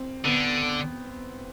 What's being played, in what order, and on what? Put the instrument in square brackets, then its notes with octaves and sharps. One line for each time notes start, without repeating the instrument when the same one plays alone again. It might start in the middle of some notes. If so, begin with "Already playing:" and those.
Already playing: [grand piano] C4
[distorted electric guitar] D3 [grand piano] B3